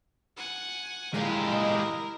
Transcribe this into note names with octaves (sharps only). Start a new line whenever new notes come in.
F#5 G#5
F3 G#3 E4 G4 A#4 D5 F5
D#5